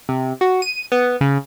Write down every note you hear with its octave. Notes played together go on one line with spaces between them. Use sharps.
C3
F#4
D#7
B3
C#3